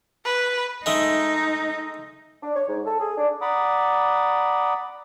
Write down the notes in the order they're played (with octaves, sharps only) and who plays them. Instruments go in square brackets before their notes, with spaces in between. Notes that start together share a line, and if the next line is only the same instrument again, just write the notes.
[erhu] B4
[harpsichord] G#3 A3 [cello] D#4
[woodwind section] D4
C#5
G#2
A4
G#4
D4
[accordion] D5 F#5 A#5 B5 D6 D#6